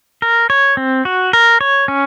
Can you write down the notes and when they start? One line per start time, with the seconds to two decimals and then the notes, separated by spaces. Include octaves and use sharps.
0.22 A#4
0.50 C#5
0.77 C4
1.05 F#4
1.33 A#4
1.61 C#5
1.88 C#4